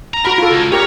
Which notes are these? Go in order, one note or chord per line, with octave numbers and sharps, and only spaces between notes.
A#5
F#4 A#4 A#5 B5
F4 A4
C#2
G4 A#4 C#5 A#5